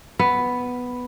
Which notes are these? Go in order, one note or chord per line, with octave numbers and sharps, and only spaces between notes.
B3